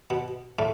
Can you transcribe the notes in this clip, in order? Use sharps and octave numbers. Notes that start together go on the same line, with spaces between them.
B2 B3
A2 A3